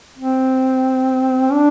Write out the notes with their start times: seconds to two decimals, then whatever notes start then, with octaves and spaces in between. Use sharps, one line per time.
0.17 C4
1.52 D4